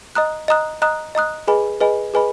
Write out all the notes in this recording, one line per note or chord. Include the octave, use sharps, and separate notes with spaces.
D#5 A#5 D#6 F#6
D#5 A#5 D#6 F#6
D#5 A#5 D#6 F#6
D#5 A#5 D#6 F#6
G#4 B4 D#5 G#5 B5
G#4 B4 D#5 G#5 B5
G#4 B4 D#5 G#5 B5